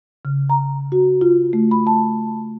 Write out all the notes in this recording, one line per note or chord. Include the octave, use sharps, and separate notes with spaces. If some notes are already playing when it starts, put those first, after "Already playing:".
C#3
A#5
F#4
F4
A3
B5
A5